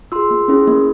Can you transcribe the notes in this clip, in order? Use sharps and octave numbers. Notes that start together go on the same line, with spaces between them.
F4 G#4 C6 E6
A#3
C#4 E4 G#4
A#3